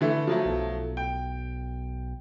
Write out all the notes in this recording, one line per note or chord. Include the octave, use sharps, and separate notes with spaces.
D3 E3 A3
F3 F#3 A3
B1
G5